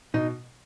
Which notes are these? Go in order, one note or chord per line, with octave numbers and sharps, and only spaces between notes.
B2 D#4